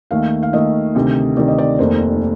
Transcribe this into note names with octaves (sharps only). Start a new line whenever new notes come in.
D#2 D#3 A3 F5
F5
D#2 D#3 A3 D#5
D2 C3 D#3
D2 C3 D#3 D5
D#5
D5
F1 D#2 D#3 A#3 C5